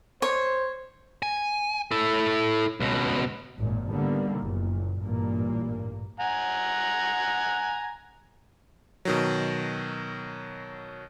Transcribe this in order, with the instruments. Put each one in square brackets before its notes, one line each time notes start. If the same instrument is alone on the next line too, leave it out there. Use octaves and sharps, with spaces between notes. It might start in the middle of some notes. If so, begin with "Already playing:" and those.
[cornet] C5 [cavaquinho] C#5
[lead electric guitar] G#5
E4 A4
C#2 B2
[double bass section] G#1 F#2 A#2
D3 D#3 G3 A#3 B3
F#1 A#2
A1 G2 A#2 A#3
[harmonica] F#5 G#5 A#5
[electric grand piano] B2 D#3 F#3